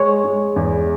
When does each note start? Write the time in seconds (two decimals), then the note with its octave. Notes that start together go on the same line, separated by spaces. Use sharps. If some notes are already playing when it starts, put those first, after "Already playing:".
Already playing: G#3 C#5
0.24 G#3
0.56 E2